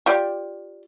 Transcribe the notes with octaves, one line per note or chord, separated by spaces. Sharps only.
F4 G4 D5